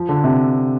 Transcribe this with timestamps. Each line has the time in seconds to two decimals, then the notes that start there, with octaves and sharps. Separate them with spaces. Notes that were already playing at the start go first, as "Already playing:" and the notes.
Already playing: F3
0.09 D3
0.24 C3